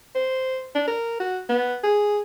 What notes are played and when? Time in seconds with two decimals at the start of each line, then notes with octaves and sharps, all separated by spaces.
0.15 C5
0.75 D4
0.88 A#4
1.20 F#4
1.49 B3
1.84 G#4